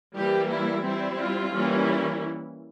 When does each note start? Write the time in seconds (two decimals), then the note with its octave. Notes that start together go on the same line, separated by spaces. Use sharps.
0.16 E3 G3 A#3 G4
0.51 E4
0.85 G3 C4 E4
1.19 F4
1.54 E3 G3 A#3 C#4 E4